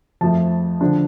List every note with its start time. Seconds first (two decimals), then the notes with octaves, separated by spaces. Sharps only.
0.21 F2 F3 A3 A5
0.81 D3 F3 D4